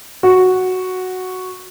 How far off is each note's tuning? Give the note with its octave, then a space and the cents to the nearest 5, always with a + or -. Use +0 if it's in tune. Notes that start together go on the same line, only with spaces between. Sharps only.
F#4 +0